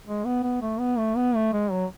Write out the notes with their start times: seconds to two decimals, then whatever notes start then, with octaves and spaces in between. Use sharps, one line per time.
0.07 G#3
0.25 B3
0.43 B3
0.62 A3
0.80 B3
0.98 A3
1.17 B3
1.35 A3
1.53 G#3
1.72 F#3